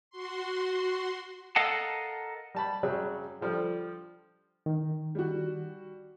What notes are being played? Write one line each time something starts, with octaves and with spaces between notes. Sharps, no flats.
F#4 C6
A4 A#4 D#5 F5 F#5 A5
G3 A5 B5
F#2 C#3 F#3 G3
D3 F3 G3
D#3
G3 F#4